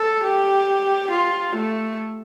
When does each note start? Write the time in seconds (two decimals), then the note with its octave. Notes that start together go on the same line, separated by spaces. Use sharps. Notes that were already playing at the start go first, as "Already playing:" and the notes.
Already playing: A4
0.24 G4
1.11 F4
1.56 A3